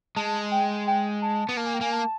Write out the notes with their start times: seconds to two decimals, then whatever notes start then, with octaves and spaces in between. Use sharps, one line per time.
0.16 G#3 A5
0.52 G5
0.87 G5
1.22 A5
1.49 B3
1.57 A#3 A5
1.66 G#5
1.74 G5
1.81 A#3 G#5
1.92 A5